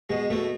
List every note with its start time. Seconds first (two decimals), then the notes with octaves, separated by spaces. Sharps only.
0.10 B2 G#3
0.30 B2 A3